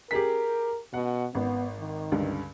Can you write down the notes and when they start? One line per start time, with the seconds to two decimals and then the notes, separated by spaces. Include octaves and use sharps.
0.11 G4 G#4 A#4 B6
0.94 B2 F#5
1.35 G#1 B3
1.80 D#3
2.12 C#2 G2 D3